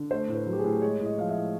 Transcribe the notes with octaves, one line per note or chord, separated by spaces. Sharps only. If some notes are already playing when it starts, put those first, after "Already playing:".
Already playing: D3
A3 C5
A2
B4
F#3
G4
G#4
A2
G#3 C#5
A2
D#5
F3 F5
E5
A2